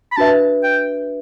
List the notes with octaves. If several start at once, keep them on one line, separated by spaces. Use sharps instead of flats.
B5
D4 F#4 B4 E5 A5
G5